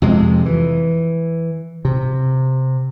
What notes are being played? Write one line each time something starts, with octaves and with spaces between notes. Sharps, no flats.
F2 C3 G#3
E3
C3